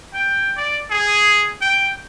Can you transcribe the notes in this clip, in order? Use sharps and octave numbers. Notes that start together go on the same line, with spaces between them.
G5
D5
G#4
G5